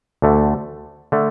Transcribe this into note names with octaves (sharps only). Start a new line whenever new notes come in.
D2 D3 A3
D3 A3